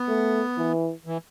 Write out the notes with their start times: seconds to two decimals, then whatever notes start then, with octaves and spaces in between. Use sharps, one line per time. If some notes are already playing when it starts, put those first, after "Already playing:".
Already playing: B3
0.08 A3
0.58 E3
1.06 E3